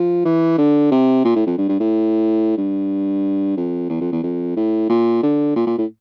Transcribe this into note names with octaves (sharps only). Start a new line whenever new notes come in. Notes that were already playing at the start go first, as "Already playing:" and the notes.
Already playing: F3
E3
D3
C3
A#2
A2
F2
G2
G2
A2
G2
F2
E2
F2
E2
F2
A2
A#2
D3
A#2
A#2
A2